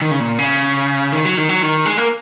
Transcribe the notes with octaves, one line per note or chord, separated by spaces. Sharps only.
D#3
C#3
A#2
C#3
D#3
F#3
D#3
F#3
D#3
G#3
A#3